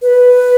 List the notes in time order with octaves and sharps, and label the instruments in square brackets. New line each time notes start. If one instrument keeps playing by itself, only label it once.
[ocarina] B4